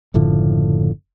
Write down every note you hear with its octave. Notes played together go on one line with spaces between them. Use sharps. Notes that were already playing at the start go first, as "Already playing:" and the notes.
F#1 A2 D3 F3